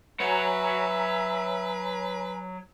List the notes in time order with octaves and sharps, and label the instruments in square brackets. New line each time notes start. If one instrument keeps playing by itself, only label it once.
[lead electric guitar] F#3 F#5 [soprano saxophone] B4 [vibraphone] C#5 G#5 A#5 [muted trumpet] E5